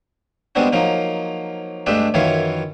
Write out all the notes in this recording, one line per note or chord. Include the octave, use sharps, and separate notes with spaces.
G3 G#3 B3 C4 D4 F#4
F3 F#3 A#3 D#4
G2 G#3 A3 D4 G4 E5
F#2 D#3 E3 E4 F4 C#5